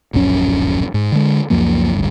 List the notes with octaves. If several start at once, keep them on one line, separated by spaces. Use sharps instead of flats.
D1 A#1 F#2 C#4
G#2
D3 G#3
C#2 F#2 F3 A#3
G#1 D2 G2